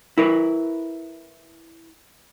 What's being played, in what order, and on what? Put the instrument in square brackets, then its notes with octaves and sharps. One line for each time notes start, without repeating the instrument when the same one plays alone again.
[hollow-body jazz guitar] E4 A#4 B4